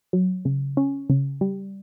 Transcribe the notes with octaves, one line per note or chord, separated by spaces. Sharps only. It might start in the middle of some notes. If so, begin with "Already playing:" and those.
F#3
C#3
C#4
C#3
G3